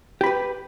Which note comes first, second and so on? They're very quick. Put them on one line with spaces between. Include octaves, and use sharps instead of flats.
G4 B5 B4